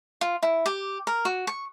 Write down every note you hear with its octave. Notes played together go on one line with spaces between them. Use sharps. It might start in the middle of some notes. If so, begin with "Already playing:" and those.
F4
E4
G4
A#4
F#4
C#6